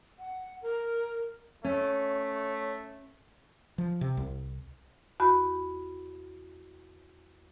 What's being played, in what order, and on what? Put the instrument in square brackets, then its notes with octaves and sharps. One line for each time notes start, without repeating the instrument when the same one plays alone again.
[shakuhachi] F#5
A#4
[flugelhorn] A3 [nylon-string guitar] C#4 [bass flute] C#5
[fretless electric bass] F3
C3
C2
[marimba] E2 F#4 B5